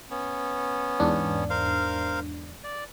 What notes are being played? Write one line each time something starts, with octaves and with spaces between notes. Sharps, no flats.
B3 C#4
E2 G#2 D4
A#4 C5 F5
D5